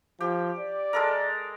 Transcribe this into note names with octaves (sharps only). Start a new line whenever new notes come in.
F3 G4
D5
G#3 A4 A#4